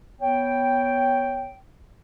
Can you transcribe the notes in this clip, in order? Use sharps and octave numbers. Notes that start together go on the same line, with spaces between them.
B3 C#5 G5